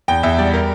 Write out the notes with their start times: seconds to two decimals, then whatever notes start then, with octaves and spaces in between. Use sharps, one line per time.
0.08 E2 G5
0.23 E2 E5
0.38 G3 D5
0.53 A#4